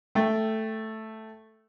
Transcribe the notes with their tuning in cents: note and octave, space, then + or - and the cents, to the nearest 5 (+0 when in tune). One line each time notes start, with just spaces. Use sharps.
A3 +0 G5 +0